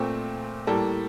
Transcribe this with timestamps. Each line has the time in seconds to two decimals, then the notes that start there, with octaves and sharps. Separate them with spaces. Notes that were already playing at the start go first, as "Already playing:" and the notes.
Already playing: A#2 A3 C4
0.67 A2 G3 A#3 A4